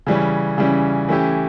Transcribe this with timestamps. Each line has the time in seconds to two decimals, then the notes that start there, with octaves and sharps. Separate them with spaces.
0.07 C#3 E3 G3 C#4
0.58 C#3 E3 G3 C#4
1.09 E3 A3 C#4 E4 G4